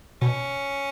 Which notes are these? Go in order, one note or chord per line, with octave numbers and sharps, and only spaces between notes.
B2 C#4